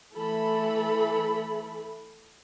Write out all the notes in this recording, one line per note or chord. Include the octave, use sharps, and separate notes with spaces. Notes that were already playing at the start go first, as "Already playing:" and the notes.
E3 A3 A4 B5